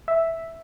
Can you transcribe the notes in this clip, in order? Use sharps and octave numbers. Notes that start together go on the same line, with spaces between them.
E5